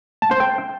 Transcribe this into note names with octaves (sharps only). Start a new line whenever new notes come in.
A5
C5
G5